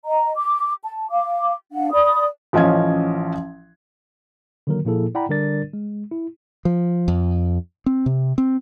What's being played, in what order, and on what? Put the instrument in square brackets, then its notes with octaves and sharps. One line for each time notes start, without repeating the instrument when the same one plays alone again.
[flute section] D#5 A#5
D6
A5
F5 D6
D4 F5 F#5
D5 B5 D#6
[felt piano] A1 F3 C#4 D#5 F5 G#6
[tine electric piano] D3 D#3 F#3 A#3 A#4
A#2 F3 A#3 E4 G#4 A4
E4 D5 F#5 G5 A#5 B5
D3 G3 D4 A#4 D5 A6
G#3
E4
[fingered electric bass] F3
F2
C4
C3
C4